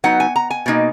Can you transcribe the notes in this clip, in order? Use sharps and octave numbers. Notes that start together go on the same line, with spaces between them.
F#3 B3 D#4 F#5
G#5
A#5
G#5
B2 A#3 D#4